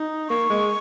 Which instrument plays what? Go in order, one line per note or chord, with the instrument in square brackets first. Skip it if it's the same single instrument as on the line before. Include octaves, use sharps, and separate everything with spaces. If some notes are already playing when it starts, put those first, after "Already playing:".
Already playing: [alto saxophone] D#4
[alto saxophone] A#3 [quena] C#6
[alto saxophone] G#3